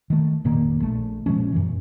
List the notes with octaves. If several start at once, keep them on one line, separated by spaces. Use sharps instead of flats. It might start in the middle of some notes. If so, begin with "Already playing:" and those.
D#3 A3
F1 A#2 D#3 A#3
A#1 A3
A#2 F3 G#3 C#4
F#2 A#2 E3